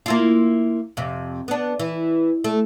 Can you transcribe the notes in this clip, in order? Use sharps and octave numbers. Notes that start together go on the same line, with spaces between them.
A#3 E4 F4
F2 C3
B3 D4
E3
A3